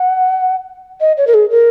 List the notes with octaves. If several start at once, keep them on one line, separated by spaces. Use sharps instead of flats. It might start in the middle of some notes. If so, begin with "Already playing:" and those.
Already playing: F#5
D#5
C#5
A#4
G#4
A#4